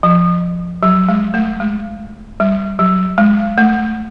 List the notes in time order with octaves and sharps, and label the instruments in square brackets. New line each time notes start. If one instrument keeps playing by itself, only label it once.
[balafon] F3
F#3
G#3
A3
G#3
G3
F#3
G#3
A3